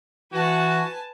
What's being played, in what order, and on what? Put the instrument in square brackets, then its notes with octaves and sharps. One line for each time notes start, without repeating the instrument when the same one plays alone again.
[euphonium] E3 [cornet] F#4 [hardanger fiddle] B4 [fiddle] G#5 A5